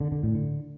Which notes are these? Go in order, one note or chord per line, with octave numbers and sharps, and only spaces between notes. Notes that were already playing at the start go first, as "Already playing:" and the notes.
D3
D3
A2
D3